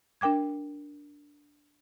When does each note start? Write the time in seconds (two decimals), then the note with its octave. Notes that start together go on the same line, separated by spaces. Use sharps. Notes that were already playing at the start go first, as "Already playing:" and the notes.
0.21 D4 A#4 G5 D6 G#6